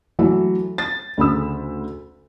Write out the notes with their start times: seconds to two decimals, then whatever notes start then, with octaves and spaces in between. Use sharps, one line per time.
0.19 E3 F#3 A3 A4
0.78 A6
1.18 D2 C#3 B5 E6